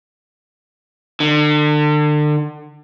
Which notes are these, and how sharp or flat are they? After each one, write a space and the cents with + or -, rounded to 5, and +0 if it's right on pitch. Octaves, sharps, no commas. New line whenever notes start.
D3 +35